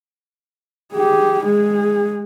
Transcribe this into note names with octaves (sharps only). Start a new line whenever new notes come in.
G4 G#4
G#3 G#4